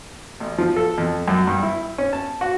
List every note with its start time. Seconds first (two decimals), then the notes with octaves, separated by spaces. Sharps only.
0.40 A1
0.58 F3
0.76 A4
0.98 F2
1.28 F#2
1.47 G2
1.63 E4
1.98 C#4
2.13 A5
2.41 F#4